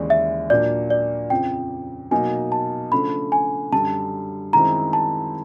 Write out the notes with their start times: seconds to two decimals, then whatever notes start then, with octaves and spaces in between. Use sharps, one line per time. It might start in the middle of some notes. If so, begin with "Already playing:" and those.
Already playing: D#2 C#3 E3 G#3 D5
0.10 E5
0.50 A#2 F#3 A#3 D4 D5
0.90 D5
1.30 F2 C#3 F3 G5
2.11 B2 F#3 A#3 D#4 G#5
2.52 A5
2.92 C#3 F3 A3 D4 B5
3.32 G#5
3.72 F#2 D3 G3 A5
4.53 F#2 D#3 G#3 C4 E4 A#5
4.93 A5